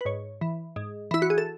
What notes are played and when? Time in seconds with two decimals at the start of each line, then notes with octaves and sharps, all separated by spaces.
0.01 B4
0.05 G#2 C#5
0.41 E3
0.76 G#2
1.11 E3 E4
1.22 F#4
1.30 G#4
1.38 A4